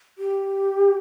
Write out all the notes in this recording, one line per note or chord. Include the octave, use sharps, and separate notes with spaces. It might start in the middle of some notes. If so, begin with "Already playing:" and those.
G4